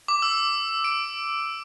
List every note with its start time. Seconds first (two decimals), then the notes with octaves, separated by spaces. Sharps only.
0.08 D6
0.22 E6
0.84 D7